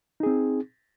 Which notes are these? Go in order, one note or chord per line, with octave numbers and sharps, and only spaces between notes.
C4 D#4 G#4